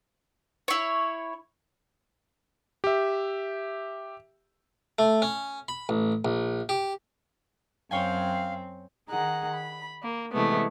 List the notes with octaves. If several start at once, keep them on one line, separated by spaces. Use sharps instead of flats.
E4 C#5
G4 E5
A3
C#4
B5
A1
A#1
G4
F#2 C4 C#5 F5 G5 G#5
D#3 G#4 F#5 A#5
B5
A#3
C3 E3 G#3 A3 B3